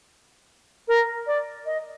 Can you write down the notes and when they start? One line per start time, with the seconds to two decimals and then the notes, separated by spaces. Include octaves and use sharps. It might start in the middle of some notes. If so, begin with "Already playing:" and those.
0.88 A#4
1.27 D5
1.66 D#5